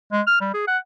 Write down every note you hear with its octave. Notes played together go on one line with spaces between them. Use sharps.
G#3
F6
G3
G#4
F#5